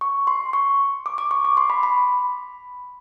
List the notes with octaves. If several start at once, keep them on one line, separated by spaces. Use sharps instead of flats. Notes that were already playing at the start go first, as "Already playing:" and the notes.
C#6
C6
C#6
D6
D6
C#6
D6
C6
B5
B5